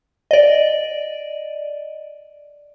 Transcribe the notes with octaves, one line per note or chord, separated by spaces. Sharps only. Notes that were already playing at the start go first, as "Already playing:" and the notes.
D5 D#5